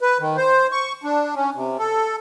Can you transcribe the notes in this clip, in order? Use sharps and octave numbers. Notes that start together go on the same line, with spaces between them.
B4
D#3
C5
C#6
D4
C#4
C3
A4